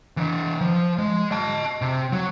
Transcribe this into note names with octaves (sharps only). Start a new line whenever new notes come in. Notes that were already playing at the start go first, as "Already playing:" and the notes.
E3 D#5
F3
G#3
D#5 A5
C3
F#3